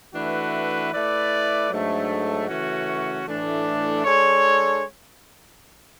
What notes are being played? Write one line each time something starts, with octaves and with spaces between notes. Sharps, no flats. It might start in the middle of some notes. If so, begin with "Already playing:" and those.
E3 A3 D4 F#4 B4
A3 E4 B4 D5
G#2 F#3 A3 D4
C#3 E3 A3 C#4 F#4
A2 E3 A3 D4
G#3 D4 A4 C#5